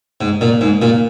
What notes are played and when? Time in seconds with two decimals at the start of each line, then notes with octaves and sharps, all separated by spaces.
0.21 G#2
0.41 A#2
0.61 G#2
0.82 A#2